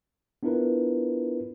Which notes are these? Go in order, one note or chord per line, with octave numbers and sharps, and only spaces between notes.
B3 D4 E4 F4 A#4 B4